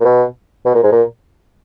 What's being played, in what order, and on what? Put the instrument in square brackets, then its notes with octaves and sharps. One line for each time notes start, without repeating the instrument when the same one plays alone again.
[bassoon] A#2
B2
B2
A#2
G#2
A#2